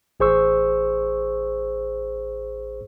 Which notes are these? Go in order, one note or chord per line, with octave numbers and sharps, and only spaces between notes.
A1 G#4 C5 C#6 E6